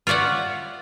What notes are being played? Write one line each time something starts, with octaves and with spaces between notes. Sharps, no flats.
F4 C#5 D5 E5 F#5